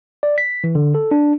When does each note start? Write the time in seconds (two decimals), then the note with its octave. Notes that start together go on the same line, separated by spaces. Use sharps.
0.23 D5
0.38 B6
0.64 E3
0.75 D3
0.95 A4
1.11 D4